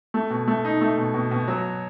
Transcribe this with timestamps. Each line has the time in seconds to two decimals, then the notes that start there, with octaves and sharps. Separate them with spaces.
0.14 A3
0.30 B2
0.48 A3
0.65 D#4
0.81 A3
0.98 B2
1.14 B2
1.31 B2
1.48 F#3